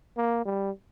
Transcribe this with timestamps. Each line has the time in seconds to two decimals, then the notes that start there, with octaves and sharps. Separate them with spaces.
0.17 A#3
0.45 G3